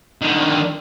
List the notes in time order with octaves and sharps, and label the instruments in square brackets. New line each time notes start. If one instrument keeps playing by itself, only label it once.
[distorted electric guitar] D3 D#3